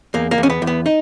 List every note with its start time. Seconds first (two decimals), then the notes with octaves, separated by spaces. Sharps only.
0.14 E2 A#3
0.31 A#3
0.38 E2
0.43 C#4
0.50 B3
0.62 E2
0.67 B3
0.86 D#4